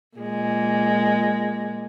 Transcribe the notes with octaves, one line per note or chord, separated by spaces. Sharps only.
A#2 G#3